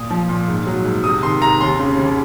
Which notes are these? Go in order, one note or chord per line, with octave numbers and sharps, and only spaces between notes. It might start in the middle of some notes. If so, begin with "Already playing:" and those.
Already playing: A#2 D#6
F3
A#2
G#2
F#3
G#2
C3 D#6
D#3 C6
C3 A#5
D#2 C6
C#3
D#2